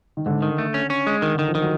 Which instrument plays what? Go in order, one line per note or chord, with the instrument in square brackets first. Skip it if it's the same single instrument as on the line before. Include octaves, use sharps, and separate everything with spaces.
[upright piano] D#3
[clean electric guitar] G#2 [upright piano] D3
[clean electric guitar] D#3
A3
C#4
C#4
G#3
D#3
[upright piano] D3 [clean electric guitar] D#3
[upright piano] F3
[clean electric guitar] D#3
[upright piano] F#3